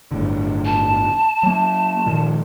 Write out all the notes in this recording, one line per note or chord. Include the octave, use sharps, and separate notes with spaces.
G1 A2 D3
A5
F#3 A#3
A#2 D#3 F3